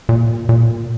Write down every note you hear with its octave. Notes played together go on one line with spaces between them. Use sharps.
A#2
A#2